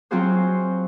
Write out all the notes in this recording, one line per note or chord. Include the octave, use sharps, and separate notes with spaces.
F#3 C4 F4 F#4 G#4 C5